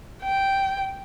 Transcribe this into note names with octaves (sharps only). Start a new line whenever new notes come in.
G5